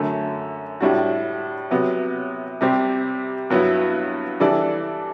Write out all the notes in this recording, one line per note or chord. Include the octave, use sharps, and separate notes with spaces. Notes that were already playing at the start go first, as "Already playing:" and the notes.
Already playing: F#2 D3 A3
A2 G3 D4 F#4
C3 F#3 B3
C3 G3 C4 G4
G2 F#3 B3 E4
E3 G3 D4 A4 D5